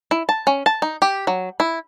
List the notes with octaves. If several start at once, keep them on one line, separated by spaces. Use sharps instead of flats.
E4
A5
C#4
A5
D#4
G4
F#3
E4